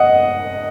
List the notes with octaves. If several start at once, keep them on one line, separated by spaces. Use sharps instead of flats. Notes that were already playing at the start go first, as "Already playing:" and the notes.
Already playing: D#5 F#5